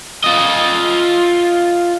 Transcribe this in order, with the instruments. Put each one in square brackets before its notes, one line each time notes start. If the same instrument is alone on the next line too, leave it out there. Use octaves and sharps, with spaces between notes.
[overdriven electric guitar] F4 D#5